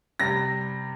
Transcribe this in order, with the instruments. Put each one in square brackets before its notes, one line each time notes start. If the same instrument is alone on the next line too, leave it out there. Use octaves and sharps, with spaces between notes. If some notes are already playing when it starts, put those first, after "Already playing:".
[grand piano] C3 G3 A#6